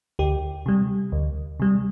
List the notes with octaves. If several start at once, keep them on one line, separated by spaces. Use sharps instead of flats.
D2 G4
C3 G3
D2
C3 G3